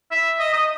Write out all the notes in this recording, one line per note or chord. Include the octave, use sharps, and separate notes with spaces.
E5
D#5
D#5